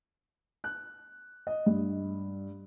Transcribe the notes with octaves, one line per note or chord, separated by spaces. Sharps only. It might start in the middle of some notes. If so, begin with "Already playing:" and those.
F#6
D#5
G2